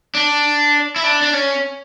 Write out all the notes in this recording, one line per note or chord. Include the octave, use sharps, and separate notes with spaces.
D4
E4
D4
D4
C#4